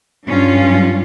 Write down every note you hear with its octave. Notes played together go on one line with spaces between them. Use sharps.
G2 F#3 C#4 F4